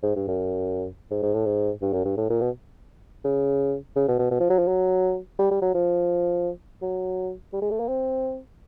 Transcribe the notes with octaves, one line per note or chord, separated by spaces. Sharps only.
G#2
G2
F#2
G#2
G#2
A2
G#2
G2
F#2
G2
A2
A#2
B2
C#3
C#3
B2
B2
B2
F3
F#3
F3
F#3
G3
G3
F#3
F3
F#3
G3
G#3
A3
A#3
C4